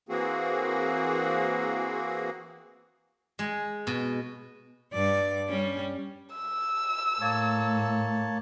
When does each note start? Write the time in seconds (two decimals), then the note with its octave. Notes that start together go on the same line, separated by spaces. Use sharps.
0.09 E3 A#3 C4 F#4 G#4
3.39 G#3
3.87 B2
4.93 G2 D5
5.49 G3 C#4
6.36 E6
7.21 A2 A#3 C#5 A5